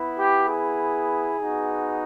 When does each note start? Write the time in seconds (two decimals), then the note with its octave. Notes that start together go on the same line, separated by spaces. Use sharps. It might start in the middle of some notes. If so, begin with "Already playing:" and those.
Already playing: B3 E4
0.17 G4
0.48 G#4
1.37 B3 D#4 F#4